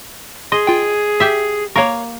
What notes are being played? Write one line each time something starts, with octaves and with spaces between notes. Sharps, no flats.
G#4 D#5 C6
F4 G5
G4 E5
A#3 A#4 C#5 F5 C#6